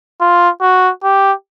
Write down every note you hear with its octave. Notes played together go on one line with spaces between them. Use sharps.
F4
F#4
G4